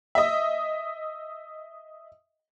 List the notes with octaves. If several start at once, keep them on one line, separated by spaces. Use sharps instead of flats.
D#5 E5